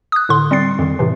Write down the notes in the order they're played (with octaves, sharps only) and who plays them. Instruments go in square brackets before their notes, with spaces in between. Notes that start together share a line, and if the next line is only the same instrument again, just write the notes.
[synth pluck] D#6 F#6
A2 D3 C6
G3 C4 A6 C7
F2 D#3
A2 C3 E3